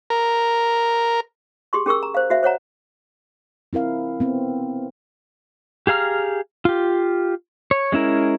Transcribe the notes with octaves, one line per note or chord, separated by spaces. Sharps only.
A#4
G4 G#4 C6 C#6
C#4 G#4 A#4 C#6 E6
A#5
C5 F5
F#4 C5 E5 F5
C5 C#5 F#5 A#5
C4 E4 A#4 F5
B3 C4
G4 G#4 F5 A#5 F6
F4 G4
C#5
G#3 C#4 E4 A#4